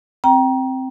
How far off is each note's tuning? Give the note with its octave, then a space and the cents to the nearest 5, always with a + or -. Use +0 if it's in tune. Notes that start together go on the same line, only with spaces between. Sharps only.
C4 +0 G5 -15 A#5 +25